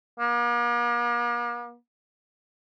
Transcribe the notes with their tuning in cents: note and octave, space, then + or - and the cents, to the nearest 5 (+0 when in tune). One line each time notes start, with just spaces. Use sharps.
A#3 +45